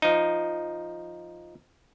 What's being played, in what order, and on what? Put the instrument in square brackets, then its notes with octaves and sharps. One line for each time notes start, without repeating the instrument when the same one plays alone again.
[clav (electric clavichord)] F3 D#4